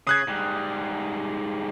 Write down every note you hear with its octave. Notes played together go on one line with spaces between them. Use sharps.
C#3 D#6 F#6 G#6
G#2 G3